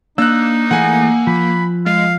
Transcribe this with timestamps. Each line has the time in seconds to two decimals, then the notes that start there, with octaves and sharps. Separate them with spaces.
0.18 A#3 D4 D#4 E6 F#6
0.71 E3 A3 G#4 F#5 G#5
1.27 F3 B5
1.86 G#3 F5